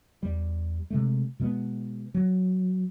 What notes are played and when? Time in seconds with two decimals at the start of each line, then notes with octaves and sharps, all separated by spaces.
0.23 E2 G3
0.90 C3 G#3 A3
1.40 B2 G#3 A3 B3
2.14 F#3